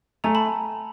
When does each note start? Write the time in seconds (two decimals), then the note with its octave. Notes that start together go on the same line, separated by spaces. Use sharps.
0.24 A3 G#5 A#5
0.35 A5 B5